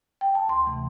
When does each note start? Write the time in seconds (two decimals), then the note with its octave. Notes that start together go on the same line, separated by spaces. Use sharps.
0.21 G5
0.35 A5
0.49 D2 C6
0.66 C3 E3 A3